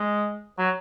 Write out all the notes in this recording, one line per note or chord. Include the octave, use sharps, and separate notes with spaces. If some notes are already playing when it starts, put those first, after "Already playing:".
Already playing: G#3
F#3